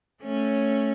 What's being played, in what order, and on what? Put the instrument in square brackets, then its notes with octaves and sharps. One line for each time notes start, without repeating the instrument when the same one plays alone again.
[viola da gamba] A3 C#4